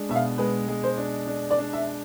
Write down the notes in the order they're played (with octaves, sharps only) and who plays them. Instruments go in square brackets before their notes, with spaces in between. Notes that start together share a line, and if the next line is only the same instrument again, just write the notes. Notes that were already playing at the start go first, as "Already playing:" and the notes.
Already playing: [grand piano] G#3 D4
[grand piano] B2 [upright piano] E5
[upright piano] F5
[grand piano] G#3 [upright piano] B4
[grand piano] G#3
[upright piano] C5
[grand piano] D4
D4
[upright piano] D5
[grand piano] D4
[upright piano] E5